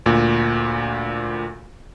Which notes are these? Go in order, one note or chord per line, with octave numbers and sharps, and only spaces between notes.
D2 A#2